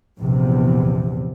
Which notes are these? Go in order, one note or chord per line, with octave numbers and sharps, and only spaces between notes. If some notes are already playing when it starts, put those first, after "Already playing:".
A#1 E2 C3